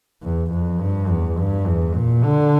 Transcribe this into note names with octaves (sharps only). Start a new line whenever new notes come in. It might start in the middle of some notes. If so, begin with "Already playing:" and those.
E2
F2
G2
E2
G2
E2
A#2
D3